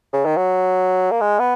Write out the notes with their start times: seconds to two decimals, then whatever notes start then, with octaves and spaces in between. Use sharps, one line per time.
0.13 C#3
0.25 D#3
0.37 F#3
1.11 A#3
1.21 G#3
1.39 B3